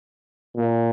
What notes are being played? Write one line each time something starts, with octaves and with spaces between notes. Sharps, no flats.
A#2